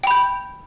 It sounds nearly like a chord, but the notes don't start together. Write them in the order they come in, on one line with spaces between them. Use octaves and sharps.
G5 B5 G6